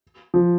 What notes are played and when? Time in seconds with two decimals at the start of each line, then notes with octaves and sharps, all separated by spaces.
0.34 F3